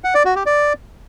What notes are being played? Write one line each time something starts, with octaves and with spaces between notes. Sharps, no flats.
F#5
D5
F#4
G4
D5